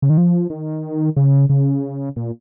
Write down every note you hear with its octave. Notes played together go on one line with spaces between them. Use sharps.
C#3
D#3
F3
D#3
C#3
C#3
A#2